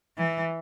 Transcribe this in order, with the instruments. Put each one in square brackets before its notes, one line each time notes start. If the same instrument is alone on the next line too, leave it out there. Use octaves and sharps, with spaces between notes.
[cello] E3